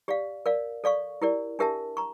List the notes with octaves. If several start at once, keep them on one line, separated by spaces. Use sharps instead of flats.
G4 D5 F5
A#4 D5 F5
A4 D5 F5 C#6
E4 G4 A#4 D5
D4 G4 A#4 E5 A5
A#5 C#6